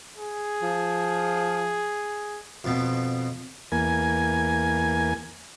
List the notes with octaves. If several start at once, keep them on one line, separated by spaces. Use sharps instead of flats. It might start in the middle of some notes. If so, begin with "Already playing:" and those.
G#4
F3
F2 B2
E2 A#3 G#5